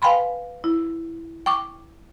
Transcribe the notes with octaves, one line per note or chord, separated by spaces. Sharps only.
B4 F5 G5 G#5 B5 C6
E4
G5 C#6 D6